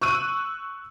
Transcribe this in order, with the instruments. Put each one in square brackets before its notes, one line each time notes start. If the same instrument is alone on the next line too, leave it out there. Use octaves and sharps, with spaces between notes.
[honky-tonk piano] C#6 E6 F#6 D#7